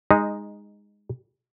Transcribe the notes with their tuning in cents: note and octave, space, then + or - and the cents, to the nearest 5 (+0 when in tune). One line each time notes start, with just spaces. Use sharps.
G#3 -15 D#4 +0